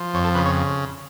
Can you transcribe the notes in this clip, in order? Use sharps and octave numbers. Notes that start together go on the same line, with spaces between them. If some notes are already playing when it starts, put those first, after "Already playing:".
Already playing: F3
F2 C#5
A4
C#3 B4
C#5